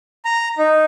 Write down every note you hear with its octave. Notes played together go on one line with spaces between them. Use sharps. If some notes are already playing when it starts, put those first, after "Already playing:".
A#5
D#4